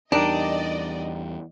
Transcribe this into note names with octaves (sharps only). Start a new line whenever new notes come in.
E2 G3 D4 D#4 G4 A#4 D5 D#5